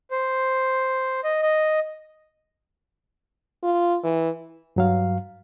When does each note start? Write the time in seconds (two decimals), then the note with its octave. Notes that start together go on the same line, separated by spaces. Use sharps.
0.11 C5
1.24 D#5
1.42 D#5
3.64 F4
4.04 E3
4.76 G2 F#3 F5